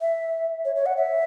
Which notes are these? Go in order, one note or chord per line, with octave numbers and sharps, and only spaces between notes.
E5
C#5
C#5
F#5
E5